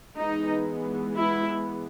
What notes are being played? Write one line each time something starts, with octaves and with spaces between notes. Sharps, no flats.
E3 G#3 B3 D#4
E4